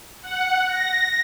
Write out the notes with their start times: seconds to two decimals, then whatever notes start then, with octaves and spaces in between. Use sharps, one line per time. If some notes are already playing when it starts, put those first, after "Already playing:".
0.21 F#5
0.67 A#6